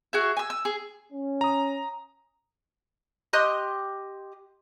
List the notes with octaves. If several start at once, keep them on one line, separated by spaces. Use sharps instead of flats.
F#4 G#4 E5
G#5 E6
E6
G#4
C#4
A#5 D#6
G4 D#5 C6 F#6